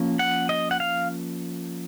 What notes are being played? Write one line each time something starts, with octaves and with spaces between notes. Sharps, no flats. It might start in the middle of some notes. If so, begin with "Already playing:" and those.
Already playing: F3 A#3 C#4
F#5
D#5
F#5
F5